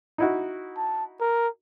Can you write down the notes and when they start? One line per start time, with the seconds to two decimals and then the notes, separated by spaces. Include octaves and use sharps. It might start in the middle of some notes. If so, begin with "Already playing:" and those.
0.18 D#4 E4 F#4
0.77 A5
1.20 A#4